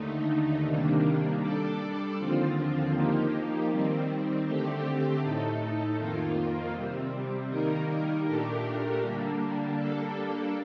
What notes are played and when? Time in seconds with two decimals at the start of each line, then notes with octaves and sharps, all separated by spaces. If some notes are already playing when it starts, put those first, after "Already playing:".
Already playing: D#2 D3 A3 D#4
0.66 C3 D#3 G3 A#3 D4
1.41 G3 D4 A4 D5
2.17 D#2 D3 F3 C4 F4
2.93 F3 A#3 D#4 G4
3.68 D#3 G3 C4
4.45 D3 A3 C4 G4
5.20 A2 A3 D#4 A4
5.96 F2 D#3 A#3 F4
6.72 C3 G3 C4
7.48 D#3 G3 A#3 D#4 A#4
8.24 A#2 A3 D4 G4 A#4
8.99 D3 G3 A#3 D4
9.76 G3 A#3 D4 A4